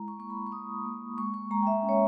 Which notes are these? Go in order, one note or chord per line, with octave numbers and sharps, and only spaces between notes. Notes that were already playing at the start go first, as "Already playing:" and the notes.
Already playing: G#3 E4 A#5
C#6
A#3 C#6
B5
C#6
A#3 D#6
A#3
G#3 C#6
C#6
G#3 A#5
G5
E5
C#4
C#5